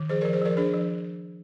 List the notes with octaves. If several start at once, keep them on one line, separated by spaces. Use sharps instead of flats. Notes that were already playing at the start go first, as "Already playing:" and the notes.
Already playing: D#3
F3 G#4 C5
A#4 D5
F3
G#4 C5
F3 A#4 D5
D4 G#4 C5
F3